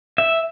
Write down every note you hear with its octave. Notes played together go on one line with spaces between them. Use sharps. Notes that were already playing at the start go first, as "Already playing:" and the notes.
E5